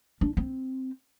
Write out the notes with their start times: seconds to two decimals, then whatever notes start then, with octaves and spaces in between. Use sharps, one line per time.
0.21 D4
0.37 C4